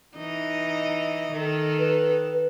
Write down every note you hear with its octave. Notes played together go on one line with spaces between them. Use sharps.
E3 D#4 D#5
D#3 A4
B4